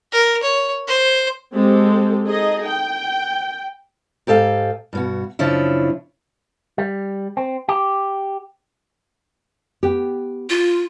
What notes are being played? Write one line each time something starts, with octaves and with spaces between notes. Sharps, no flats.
A#4
C#5
C5
G#3 C4 G4 A4
D#4 G#4 A4 D#5
G5
G#2 G4 A4 F5 G#5
G2 B2 F#4
F#2 C#3 F3 C#4 D4 E4
G3
C4
G4
B3 G4
F4